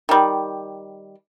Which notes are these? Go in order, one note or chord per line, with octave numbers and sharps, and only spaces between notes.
D#3 G3